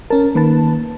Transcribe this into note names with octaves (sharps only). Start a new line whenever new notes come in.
C#4 A#4 A5
D#3 A#3 B4 A5